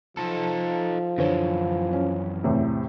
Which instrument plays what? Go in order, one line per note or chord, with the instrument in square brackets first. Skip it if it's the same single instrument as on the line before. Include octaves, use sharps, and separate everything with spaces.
[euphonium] F3 [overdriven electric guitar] D#4 A4
[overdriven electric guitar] F#2 E3 [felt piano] D3 C5 C#5
[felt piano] C#4
E2 A2 C3